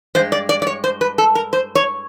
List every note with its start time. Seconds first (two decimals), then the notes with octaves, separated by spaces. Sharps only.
0.15 E3 G#3 C5
0.19 G2
0.32 D5
0.49 D5
0.62 D5
0.67 C#5
0.84 C5
1.01 B4
1.18 A4
1.35 A#4
1.53 C5
1.75 C#5